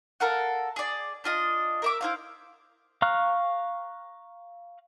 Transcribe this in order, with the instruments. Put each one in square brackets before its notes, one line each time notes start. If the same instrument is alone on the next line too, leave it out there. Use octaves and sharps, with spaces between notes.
[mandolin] A4 A#4 F5 F#5
G#4 D5
D4 F4 D#5
A#4 E5 D6
E4 C5 F5
[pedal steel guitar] F5 A#5 C#6 F6 F#6